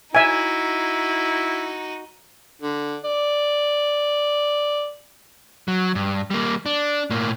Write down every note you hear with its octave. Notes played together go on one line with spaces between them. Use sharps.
D#4 E4 F#4 E5 G#5
D3
D5
F#3
G2
G3 A#3
D4
A2 A#3